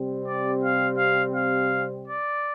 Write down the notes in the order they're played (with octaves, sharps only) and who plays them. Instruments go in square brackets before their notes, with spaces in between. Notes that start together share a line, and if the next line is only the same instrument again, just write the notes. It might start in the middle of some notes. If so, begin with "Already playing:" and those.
Already playing: [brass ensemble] C3 G3 C4
D5
F5
F5
F5
D5